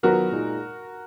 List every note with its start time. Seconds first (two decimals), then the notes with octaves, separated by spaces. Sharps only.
0.03 D#3 F#3 B3 F4 F#4 A#4 B4
0.32 A#2 G#3 D#4